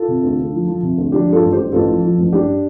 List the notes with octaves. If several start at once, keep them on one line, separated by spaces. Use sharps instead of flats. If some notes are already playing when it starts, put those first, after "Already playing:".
Already playing: F4 A4
C3
D2
D2
F3
F3
C3
D2
F3 D4 G4
G2 F4 A4
A1
G4 C5
G2
A1 F4 A4
F3
F3
A1
G2 D4 G4